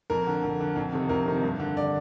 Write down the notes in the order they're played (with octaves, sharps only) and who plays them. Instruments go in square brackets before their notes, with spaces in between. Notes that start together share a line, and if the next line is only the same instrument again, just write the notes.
[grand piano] F2 A#4
D3
F2
D3
F2
C3 D#3
F2 A#4
C3 D#3
G2
D3
D5